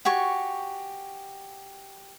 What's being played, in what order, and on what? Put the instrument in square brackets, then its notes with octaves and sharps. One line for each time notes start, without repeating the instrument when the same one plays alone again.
[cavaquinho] F#4 G4 G#5 C#6